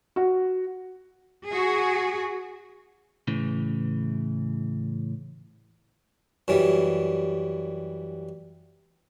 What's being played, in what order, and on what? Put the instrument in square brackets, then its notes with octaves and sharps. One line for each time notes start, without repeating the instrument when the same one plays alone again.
[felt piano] F#4
[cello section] F#4 G#4
[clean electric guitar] A2 C#3 E3
[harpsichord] F#2 E3 G3